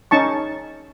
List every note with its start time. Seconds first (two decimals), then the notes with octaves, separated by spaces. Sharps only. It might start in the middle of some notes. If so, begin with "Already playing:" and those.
0.11 C#4 D#4 A5 C#6